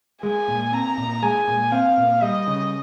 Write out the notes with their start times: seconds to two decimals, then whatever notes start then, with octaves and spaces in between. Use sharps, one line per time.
0.22 G#3 G#5
0.48 A#2
0.72 C4 A#5
0.98 A#2
1.22 G#3 G#5
1.48 A#2
1.72 C4 F5
1.97 A#2
2.22 G3 D#5
2.47 C#3